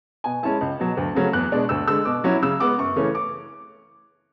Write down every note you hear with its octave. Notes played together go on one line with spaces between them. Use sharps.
B2 G#5
G#3 C#4 E4 A5
C#2
B2 F#3
D2
C#3 F#3 A3 C#4
E2 F#6
B2 G#3 D4
D2 E6
D3 G#3 E6
B2 D6
F#3 C#4 E4
C#3 E6
G#3 B3 D6
F#2 C#6
C#3 E3 A3 C#4
D6